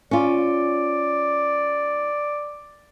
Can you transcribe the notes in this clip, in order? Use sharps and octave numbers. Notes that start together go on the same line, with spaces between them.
C#4 F4 D5